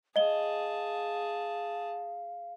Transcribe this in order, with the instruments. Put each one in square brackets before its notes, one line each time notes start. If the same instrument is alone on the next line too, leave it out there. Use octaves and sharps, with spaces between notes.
[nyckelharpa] G#4 A5 [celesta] D#5 G7 [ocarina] F5